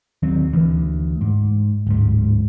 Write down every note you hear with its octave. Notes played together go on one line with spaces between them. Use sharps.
D#2 D#3 F#3 C4
D2 E3
G#2
D1 G#2